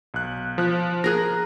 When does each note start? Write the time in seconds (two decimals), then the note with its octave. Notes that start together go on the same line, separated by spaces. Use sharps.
0.14 B1 F#6
0.58 F3 F#6
1.04 G#4 A#4 F#6 A#6